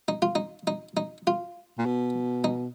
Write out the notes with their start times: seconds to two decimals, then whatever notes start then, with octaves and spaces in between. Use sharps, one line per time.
0.08 D#4
0.22 F4
0.35 D#4
0.67 D#4
0.97 D#4
1.27 F4
1.78 A#2
1.86 B2
2.44 D#4